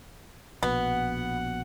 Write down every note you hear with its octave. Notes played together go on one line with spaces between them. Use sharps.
A#1 B2 B3 F#5